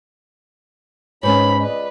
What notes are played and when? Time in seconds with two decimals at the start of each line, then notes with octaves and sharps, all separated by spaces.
1.23 G#2 B3 C#4 D#4 B4 C#5 B5
1.60 C#2 B4 D5 D#5